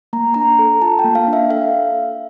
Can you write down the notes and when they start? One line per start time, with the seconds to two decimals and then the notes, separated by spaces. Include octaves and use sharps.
0.13 A#3 A#5
0.34 D4 A#5
0.59 A4
0.82 F4 A5
0.99 G5
1.04 A#3
1.15 F5
1.28 D4
1.33 E5
1.50 A4 F5